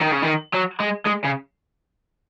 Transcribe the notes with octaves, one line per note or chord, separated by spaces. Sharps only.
D#3
C#3
D#3
F#3
G#3
G#3
C#3